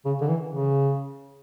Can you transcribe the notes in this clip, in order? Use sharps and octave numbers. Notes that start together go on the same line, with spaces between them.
C#3
D3
E3
C#3